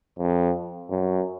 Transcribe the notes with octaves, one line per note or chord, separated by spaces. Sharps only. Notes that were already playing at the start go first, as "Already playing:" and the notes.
F2
F#2